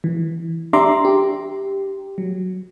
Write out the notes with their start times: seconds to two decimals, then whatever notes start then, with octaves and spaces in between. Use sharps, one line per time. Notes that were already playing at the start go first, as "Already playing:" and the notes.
0.04 E3
0.73 D4 G4 E5 A#5 C6 D6
1.05 G4
2.18 F#3